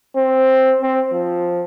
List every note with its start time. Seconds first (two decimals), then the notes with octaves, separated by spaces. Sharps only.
0.16 C4
0.82 C4
1.13 F3